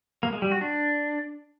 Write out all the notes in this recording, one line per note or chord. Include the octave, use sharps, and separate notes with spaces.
A#3
G#3
G3
F#4
D4